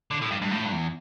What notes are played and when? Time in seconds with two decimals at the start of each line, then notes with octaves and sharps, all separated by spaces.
0.11 D3
0.22 A2
0.31 G2
0.42 G2
0.51 A2
0.65 G2
0.72 E2